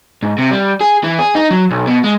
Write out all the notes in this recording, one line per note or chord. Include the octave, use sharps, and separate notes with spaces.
G#2
C3
G3
G#4
E3
G#4
D#4
F#3
B1
B2
G#3